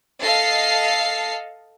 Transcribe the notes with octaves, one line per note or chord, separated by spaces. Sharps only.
A4 D#5 F5 C7